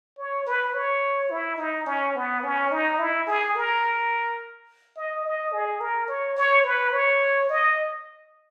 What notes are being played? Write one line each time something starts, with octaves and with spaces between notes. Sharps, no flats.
C#5
B4
C#5
E4
D#4
C#4
B3
C#4
D#4
E4
G#4
A#4
D#5
D#5
G#4
A#4
C#5
C#5
B4
C#5
D#5